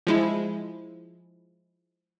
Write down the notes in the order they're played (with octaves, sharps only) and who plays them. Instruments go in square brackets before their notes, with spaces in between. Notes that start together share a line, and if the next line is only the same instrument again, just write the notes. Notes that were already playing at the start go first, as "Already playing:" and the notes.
[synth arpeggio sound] F3 G#3 E4